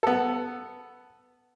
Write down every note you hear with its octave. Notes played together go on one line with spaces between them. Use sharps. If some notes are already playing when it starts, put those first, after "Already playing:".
B3 A4